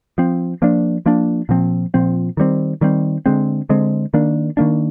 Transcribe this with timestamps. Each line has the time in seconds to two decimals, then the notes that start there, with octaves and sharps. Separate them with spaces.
0.18 F3 C4
0.62 F3 A#3 D4
1.06 F3 A#3 D4
1.49 A#2 F3 C4
1.94 A#2 F3 C4
2.37 D#3 G3 C4
2.81 D#3 G3 C4
3.26 D3 G#3 C4
3.69 D3 G#3 C4
4.14 D#3 A#3 D4
4.57 D#3 A#3 D4